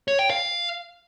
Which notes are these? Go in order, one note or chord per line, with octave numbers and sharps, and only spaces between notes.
C#5
G5
F5